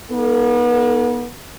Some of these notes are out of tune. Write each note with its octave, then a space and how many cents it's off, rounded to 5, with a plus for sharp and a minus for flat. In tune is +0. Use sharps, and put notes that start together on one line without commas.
B3 -35 D#4 +0 A4 +0